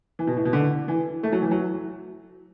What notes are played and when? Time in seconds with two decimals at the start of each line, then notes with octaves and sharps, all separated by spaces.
0.19 E3
0.27 B2
0.36 A2
0.45 B2
0.53 D3
0.88 E3
1.23 A3
1.32 F#3
1.42 E3
1.51 F#3